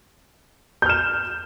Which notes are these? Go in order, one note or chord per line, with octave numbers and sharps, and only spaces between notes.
F6 G6 E7